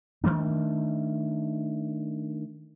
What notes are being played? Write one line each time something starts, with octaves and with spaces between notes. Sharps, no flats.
D#3 F#3 A3 D4